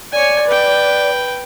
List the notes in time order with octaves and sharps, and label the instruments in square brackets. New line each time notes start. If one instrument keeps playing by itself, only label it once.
[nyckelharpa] C#5 G#5 [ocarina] D5
[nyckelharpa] B4 G5